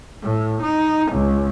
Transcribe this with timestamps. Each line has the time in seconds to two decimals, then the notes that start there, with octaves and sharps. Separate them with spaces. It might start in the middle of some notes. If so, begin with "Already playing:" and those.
0.22 A2
0.62 D#4
1.12 C#2